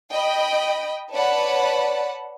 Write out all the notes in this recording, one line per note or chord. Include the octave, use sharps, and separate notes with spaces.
D#5 G5 B5
B4 C#5 D5 F#5 A5 B5